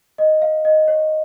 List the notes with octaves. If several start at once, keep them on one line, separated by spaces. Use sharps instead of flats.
D#5
F5
D#5
C#5